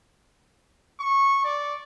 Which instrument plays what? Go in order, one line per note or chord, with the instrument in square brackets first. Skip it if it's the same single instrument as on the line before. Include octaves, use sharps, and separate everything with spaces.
[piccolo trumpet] C#6
D5